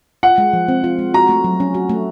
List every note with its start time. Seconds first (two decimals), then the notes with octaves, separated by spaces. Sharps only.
0.23 F4 F#5
0.38 G#3
0.53 F3
0.68 C4
0.84 F4
0.99 G#3
1.14 F#4 A#5
1.29 A3
1.44 F#3
1.60 C#4
1.74 F#4
1.89 A3